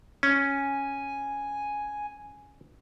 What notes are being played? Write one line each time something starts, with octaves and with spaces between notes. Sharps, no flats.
C#4 G#5